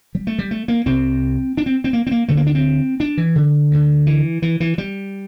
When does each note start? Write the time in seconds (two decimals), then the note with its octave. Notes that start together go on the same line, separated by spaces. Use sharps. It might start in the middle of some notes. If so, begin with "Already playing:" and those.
0.15 G3
0.27 A3
0.39 G3
0.51 A3
0.68 A#3
0.86 C2 C3 C4
1.57 D4
1.66 C4
1.84 C4
1.93 A#3
2.07 C4
2.11 A#3
2.28 D2 D3 A3
2.37 A#3
2.46 D4
2.55 C4
3.00 D4
3.17 E3
3.36 D3
3.71 D2 D3
4.07 E3
4.42 E3
4.60 E3
4.78 G3